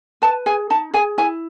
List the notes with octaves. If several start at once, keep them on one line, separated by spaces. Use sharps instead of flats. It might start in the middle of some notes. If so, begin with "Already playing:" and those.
B4 A5
G#4 G#5
D#4 A5
G#4 G#5
E4 G#5